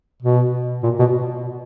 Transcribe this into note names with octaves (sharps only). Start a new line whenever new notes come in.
B2
A#2
B2